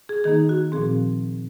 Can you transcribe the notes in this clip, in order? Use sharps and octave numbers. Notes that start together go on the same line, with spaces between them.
G#4
D#3 A#3 D#4 G#4
F#4
A#2 F3 C4 G#4